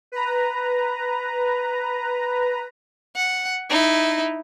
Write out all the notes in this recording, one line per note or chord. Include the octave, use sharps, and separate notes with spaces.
B4 A#5
F#5
D#4 E4